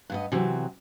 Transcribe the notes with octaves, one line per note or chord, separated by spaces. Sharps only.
G2 B3 D#5
C3 E3 F#3 C4